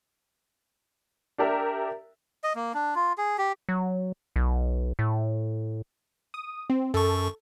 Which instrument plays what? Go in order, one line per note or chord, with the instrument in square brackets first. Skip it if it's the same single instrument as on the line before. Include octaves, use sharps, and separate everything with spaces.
[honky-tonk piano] D4 G4 A#4 E5
[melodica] D#5
A#3
D4
F4
G#4
G4
[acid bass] F#3
B1
A2
[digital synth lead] D#6
C4
[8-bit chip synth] F#2 C#6 [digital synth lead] A4